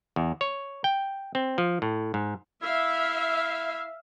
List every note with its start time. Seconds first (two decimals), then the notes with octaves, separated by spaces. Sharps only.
0.16 E2
0.41 C#5
0.84 G5
1.35 C4
1.58 F3
1.82 A2
2.14 G#2
2.63 E4 E5 F5